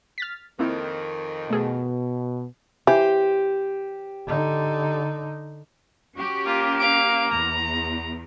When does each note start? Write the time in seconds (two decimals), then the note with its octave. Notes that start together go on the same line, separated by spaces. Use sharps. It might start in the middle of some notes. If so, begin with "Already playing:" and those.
0.18 F6 A6 B6
0.59 F2 D#3 A#3 C4 E4
1.50 B2 A3 G#4 A4
2.87 E3 G4 C5
4.27 D3 D#4
6.17 C#4 F#4 G4
6.46 A#3 F4
6.80 F5 D7
7.31 E2 A#5